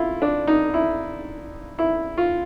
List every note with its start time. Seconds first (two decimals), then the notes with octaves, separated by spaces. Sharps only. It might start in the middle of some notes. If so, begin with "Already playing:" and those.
Already playing: E4 F4
0.22 D4
0.47 D#4
0.74 E4
1.79 E4
2.18 F4